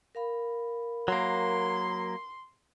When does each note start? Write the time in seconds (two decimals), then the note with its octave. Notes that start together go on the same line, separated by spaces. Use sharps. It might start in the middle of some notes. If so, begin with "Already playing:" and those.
0.15 A#4 F5 B5
1.08 F#3 A#3 C6